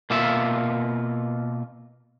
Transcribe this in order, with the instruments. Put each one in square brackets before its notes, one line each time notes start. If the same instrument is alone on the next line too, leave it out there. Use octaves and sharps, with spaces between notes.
[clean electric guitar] B2 A#3 F4 E5